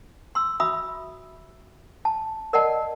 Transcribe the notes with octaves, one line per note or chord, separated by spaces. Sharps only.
C6 E6
F#4 E5 B5 D#6 E6
A5
A#4 D5 D#5 F#5 A5